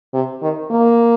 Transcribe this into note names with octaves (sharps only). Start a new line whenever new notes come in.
C3
D#3
A#3